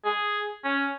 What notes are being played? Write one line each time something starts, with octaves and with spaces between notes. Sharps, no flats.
G#4
C#4